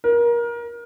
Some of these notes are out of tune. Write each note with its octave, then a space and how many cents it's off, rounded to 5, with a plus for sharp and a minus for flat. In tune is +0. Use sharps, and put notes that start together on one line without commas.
A#4 +25